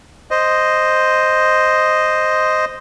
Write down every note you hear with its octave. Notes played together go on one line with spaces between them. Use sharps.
C5 D#5